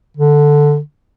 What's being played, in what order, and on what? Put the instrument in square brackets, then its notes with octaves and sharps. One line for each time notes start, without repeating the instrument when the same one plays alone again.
[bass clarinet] D3